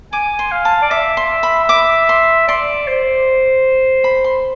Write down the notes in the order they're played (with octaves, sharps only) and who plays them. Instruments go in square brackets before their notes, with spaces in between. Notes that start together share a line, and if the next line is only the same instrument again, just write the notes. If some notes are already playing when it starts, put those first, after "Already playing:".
[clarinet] G#5 [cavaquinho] D6
[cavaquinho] C6
[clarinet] F5
[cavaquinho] A5
[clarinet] D5
[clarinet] E5 [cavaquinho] D6
[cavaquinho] C6
B5
D6
C6
[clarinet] D5 [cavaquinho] C6
[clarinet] C5
[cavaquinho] B5
C6